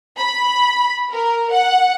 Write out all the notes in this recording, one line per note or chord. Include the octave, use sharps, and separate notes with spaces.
B5
A#4
F#5